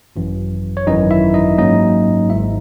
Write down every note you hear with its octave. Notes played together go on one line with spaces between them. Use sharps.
G#1 F#2 E3
C#5
G#1 F#2 E3 D#4 D#5
E4 E5
D#4 D#5
G#2 F#3 A#3 C#4 D#4 D#5
G#1 G#2 D#3 E4 E5